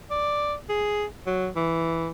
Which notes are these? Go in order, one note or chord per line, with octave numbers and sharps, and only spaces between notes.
D5
G#4
F#3
E3